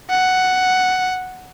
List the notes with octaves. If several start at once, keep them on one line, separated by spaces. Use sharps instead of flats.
F#5